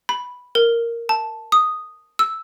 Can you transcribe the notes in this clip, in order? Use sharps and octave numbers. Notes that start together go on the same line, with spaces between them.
B5
A#4
A5
D#6
E6